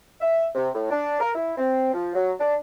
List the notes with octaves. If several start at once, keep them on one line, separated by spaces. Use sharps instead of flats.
E5
C3
A2
D4
A#4
E4
C4
F3
F#3
D4